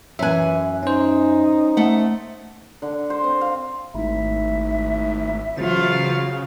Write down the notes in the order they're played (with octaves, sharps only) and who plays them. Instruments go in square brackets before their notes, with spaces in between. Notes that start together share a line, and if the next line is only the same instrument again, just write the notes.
[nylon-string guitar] F#2 G#5 [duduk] E3 [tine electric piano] E5 F#6
[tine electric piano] C#4 C5 [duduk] D#4
[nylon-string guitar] A3 F#5
[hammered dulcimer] D3
C5
C4
F5
[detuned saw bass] G#1 [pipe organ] A3 D#4 E4 [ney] E5
[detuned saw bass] C#3 [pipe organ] E3 C5 A6 [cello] F#3 F4